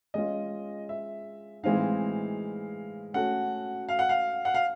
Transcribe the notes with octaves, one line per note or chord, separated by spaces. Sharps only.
G#3 C#4 F4 D#5
E5
A2 E3 G#3 C4 D#4 F5
A3 C#4 F#4 A4 F#5
F5
F#5
F5
F#5
F5